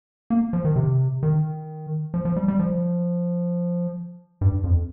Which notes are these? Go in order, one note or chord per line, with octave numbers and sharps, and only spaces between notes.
A#3
F3
D#3
C3
D#3
F3
F3
G3
G3
F3
G2
F2